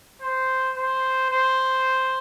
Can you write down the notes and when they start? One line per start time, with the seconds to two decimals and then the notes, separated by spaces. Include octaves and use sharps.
0.22 C5
0.77 C5
1.30 C5